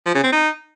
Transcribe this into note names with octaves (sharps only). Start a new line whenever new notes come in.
F3
C#3
C4
D#4